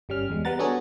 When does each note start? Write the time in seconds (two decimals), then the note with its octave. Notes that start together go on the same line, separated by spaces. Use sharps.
0.09 G1 G3 C#4 F6
0.30 E2 G#3
0.45 G3 B3 F#5 A#5 A6
0.59 B3 D4 F#4 G#4 A4 C#5